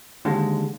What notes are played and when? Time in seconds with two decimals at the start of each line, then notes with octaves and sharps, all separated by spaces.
0.25 D#2 D3 G#3